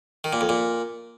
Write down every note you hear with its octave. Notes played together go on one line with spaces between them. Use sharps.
D#3
A#2
F2
A#2